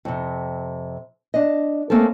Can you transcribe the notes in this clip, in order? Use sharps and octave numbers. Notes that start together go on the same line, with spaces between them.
F2 C3
D4 D#5
A3 A#3 C4 C#4 A4